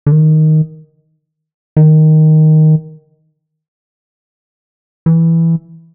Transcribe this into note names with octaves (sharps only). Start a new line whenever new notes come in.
D3
D#3
D#3
E3